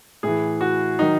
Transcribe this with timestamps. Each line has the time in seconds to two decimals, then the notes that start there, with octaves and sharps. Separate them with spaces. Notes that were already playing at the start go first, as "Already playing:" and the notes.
0.23 A2 E3 G#4
0.61 F#4
0.99 D#3 F#3 D#4